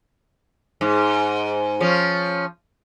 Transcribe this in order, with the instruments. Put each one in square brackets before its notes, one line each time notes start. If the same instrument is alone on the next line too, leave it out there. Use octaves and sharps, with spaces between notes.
[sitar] G#2
F3 C#4